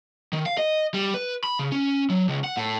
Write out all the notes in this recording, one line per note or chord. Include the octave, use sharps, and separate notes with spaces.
D#3
F5
D#5
G3
B4
B5
C#3
C#4
F#3
C#2
F#5
A2